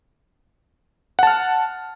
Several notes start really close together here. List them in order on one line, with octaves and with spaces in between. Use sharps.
F#5 A5 F6